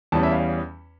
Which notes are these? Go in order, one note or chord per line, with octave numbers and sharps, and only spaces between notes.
E2 E3 G3 C#4 A5
E5
F5